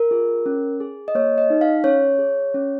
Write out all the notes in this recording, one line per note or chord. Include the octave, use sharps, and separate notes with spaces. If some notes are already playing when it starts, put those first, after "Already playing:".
Already playing: A#4
F4 G#4
C#4
G#4
D#5
A#3 C#5
D#5
D#4 G#4
F5
C#4 C#5
G#4
C#4